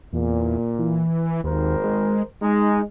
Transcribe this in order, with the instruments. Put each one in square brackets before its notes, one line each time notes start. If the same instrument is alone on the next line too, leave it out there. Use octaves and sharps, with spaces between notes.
[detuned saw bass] E2 [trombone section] A#2
[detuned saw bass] E3
[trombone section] G#1 A#4 C5 [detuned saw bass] D#2
[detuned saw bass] G#3
[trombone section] G#3 [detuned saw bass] D#4